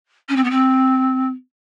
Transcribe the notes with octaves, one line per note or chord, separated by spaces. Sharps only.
C#4
C4
B3
C4